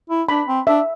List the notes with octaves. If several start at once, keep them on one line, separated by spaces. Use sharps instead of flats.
E4
D4 B5
C4
D4 E5